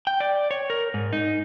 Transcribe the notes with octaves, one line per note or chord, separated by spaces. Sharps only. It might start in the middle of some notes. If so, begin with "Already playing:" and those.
G5
D5
C#5
A#4
G#2
D#4